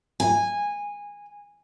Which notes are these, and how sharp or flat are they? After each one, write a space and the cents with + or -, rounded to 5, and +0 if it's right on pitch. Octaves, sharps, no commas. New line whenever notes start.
G#5 -15